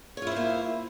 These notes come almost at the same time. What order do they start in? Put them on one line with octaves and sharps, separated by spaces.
C#5 F4 E4 C5 A#3